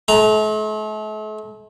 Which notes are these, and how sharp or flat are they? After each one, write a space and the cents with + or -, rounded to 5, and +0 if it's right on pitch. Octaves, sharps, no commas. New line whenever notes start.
A3 -40 A#5 +0